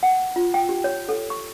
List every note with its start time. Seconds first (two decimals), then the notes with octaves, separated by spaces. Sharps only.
0.03 F#5
0.36 F4
0.54 G5
0.69 G4
0.84 C#5
1.09 A4
1.30 C#6